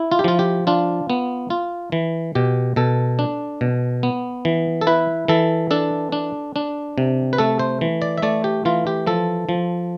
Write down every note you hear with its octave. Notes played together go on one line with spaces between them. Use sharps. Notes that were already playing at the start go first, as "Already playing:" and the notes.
Already playing: E4
F4
G4
F3 F4
G4
D4 F4
B3
F4
E3
B2 G4
B2 A4
D4
B2
B3
E3
A4
E4 B4
E3 A4
D4 A4
D4
D4
C3
B4
A3 A4
C5
E3
D5
E5
A3 D5
G4
E3 F4
G4
F3 A4
F3